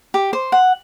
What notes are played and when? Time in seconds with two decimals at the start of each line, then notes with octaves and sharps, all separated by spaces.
0.14 G4
0.33 C5
0.52 F#5